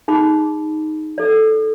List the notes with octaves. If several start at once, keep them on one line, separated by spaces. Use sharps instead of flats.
D#4 G#4 B5 D6
A4 D5